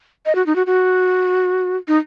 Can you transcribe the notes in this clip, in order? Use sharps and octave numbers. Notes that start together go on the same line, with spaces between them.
D#5
F#4
D#4
F#4
F#4
D#4